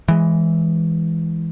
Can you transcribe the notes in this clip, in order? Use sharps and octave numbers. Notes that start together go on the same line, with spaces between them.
E3 G#3